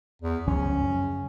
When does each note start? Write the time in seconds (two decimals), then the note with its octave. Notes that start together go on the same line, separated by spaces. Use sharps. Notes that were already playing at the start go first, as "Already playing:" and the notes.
0.22 E2
0.47 C#2 F#2 F3 C#4
0.80 F#2 C#3